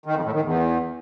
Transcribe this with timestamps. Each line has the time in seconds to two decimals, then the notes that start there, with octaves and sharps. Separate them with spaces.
0.06 D#3
0.15 F2
0.24 A2
0.34 D#3
0.43 E2